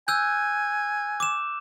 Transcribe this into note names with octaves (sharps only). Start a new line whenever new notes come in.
G#5 E6 F#6 G6
D6 E7